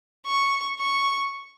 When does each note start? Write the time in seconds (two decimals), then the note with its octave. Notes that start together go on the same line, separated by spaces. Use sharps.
0.26 C#6
0.79 C#6